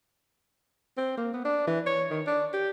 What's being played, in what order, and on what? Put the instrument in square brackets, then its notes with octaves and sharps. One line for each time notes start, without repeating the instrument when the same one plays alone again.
[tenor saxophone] C4
A#3
B3
D4
E3
C#5
D#3
D4
G4